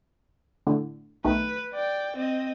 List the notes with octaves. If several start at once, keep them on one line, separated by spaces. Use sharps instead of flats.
A2 D3
B1 D#3 A3 B4
D5 G5
C4 D#5